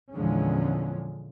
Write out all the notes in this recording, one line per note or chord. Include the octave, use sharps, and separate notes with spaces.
E2 A#2 D3 F3 G#3 C#4